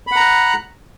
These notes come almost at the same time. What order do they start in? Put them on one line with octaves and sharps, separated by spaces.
B5 F#5 A#5 F#6